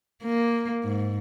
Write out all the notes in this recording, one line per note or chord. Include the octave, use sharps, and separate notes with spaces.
A#3
G#2